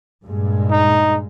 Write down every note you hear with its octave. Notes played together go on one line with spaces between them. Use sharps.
G2 A#2 G#3
D#4